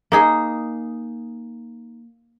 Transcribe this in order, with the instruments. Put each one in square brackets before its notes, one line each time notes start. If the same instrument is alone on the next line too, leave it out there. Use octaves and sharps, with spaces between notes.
[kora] A#3 D#4 G#4